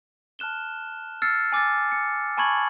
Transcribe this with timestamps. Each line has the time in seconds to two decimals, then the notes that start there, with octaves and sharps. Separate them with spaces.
0.39 A5 F6 F#6 E7 G7
1.22 E6 F6 A6 C7 C#7
1.52 G#5 D6 E6 A6
1.92 C#7
2.37 G#5 A5 B5 C#6 G#6 F#7